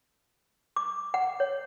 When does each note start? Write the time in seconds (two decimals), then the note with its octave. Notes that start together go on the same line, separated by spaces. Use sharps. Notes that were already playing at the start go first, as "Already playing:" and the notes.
0.76 D6
1.14 F#5
1.40 C#5